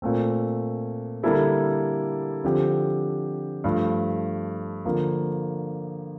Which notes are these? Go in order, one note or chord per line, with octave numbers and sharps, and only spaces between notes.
A#2 A3 C4
D3 G3 A#3 E4 A4
D3 F3 C4 G4
G2 F3 A3
D3 F3 A#3